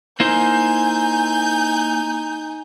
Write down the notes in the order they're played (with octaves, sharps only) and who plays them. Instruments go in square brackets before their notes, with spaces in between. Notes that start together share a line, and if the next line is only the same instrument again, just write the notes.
[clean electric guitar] A#3 E4 C5 [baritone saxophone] D#4 [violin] G#5 G6